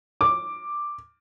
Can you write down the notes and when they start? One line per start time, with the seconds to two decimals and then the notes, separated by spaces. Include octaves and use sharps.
0.21 D6